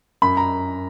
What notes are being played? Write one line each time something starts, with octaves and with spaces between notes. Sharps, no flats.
F#2 B5
A#5